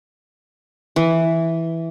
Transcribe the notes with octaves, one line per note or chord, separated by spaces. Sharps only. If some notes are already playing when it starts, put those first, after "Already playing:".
E3